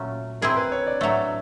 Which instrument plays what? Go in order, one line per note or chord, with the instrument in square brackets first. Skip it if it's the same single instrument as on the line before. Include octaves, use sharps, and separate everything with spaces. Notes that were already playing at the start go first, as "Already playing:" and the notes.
Already playing: [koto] A#2 F#3 A3 C#4
[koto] C4 E4 G#4 [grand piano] A#4
[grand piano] B4
C#5
D5
[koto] A2 F#3 A3 [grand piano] E5